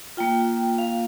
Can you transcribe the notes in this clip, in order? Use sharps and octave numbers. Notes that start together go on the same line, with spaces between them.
A#3 F4 G5
F5